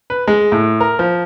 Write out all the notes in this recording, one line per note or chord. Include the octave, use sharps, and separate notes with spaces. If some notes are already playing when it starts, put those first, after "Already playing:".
B4
G#3
A2
A#4
F3